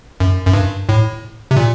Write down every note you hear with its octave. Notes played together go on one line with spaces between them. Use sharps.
F#2
F#2
G2
A2
C3
A#2